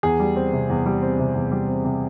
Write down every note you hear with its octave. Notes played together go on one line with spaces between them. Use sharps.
E2 G#4
G3
C4
C3
E2
G3
C4
C3
E2
G3
C4
C3